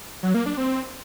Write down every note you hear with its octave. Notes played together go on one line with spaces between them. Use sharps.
F#3
A#3
D4
C4